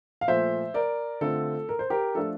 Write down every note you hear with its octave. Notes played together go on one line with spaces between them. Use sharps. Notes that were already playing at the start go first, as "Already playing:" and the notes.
F5
A#2 F3 A3 C5 E5
A#4 D5
D3 A3 C4 F4 A4
A#4
C5
G4 A#4
F3 A3 D4 F4 A4